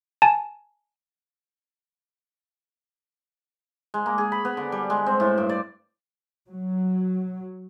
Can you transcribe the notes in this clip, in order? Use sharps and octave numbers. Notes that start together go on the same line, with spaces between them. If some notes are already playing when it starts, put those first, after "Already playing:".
G#5 A5
G#3
A#3
G#4
B5
B3
D3
G3
G#3
C4
A2
G2
D5
F#3